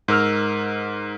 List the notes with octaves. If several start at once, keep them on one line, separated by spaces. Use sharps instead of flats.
G#2 A#4 E6 F6